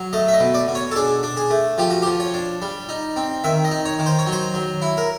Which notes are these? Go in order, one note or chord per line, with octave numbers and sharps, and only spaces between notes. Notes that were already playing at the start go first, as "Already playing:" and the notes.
Already playing: F#3
A3 D#5
E5
D#5
B2
D5
B2
C#5
A4
D4 G#4
D4
G#4
A3
F3 G4
F#4
G4
F3
C#5
D4
G3
D#4
C4
D#3 E5
D#5
D#4
C#5
D#3
C5
C#5
F#3
C5
F#3
E4
A#4